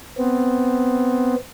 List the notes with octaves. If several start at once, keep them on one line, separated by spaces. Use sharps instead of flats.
B3 C4